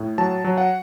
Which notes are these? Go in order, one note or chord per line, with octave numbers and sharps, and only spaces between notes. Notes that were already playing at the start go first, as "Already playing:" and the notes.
Already playing: A2
F#3 A5
F#3
F#5